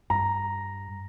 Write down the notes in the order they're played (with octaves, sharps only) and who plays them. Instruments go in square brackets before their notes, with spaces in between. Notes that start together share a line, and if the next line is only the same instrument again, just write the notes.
[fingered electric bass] G2 [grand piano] A#5